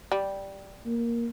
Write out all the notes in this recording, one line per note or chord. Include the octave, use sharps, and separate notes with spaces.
G3
A#3